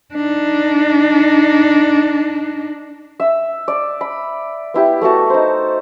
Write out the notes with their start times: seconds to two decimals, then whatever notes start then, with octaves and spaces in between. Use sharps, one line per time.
0.14 D4 D#4
3.20 E5 E6
3.68 D5
4.01 B5
4.74 B3 E4 G4
5.02 A3 B3 F#4 A5
5.30 D#4 C5